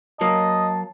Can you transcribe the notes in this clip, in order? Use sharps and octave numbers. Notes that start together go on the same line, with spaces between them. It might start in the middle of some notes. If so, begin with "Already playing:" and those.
F#3 A#3 D#5 A5